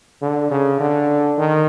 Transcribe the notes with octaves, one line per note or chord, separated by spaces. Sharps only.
D3
C#3
D3
D#3